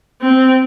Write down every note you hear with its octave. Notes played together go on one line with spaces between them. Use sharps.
C4